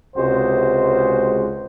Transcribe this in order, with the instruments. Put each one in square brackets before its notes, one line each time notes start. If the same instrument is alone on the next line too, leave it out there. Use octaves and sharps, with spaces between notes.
[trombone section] C#2 C3 G#3 F#4 C5